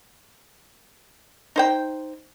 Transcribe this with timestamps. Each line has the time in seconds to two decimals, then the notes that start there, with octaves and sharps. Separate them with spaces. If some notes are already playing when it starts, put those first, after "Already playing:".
1.56 D#4 C5 G5